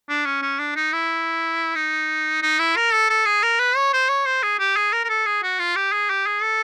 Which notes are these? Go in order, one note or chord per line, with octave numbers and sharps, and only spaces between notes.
D4
C#4
C#4
D4
D#4
E4
D#4
D#4
E4
A#4
A4
A4
G#4
A#4
B4
C#5
C5
C#5
C5
G#4
G4
G#4
A#4
A#4
A4
G#4
F#4
F4
G4
G#4
G4
G#4
A4